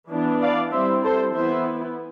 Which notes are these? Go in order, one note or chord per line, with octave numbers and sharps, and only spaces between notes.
E3 B3 D4
D5 F5
G3 C4 E4 C5 E5
A4 C5
E3 B3 E4 C5 E5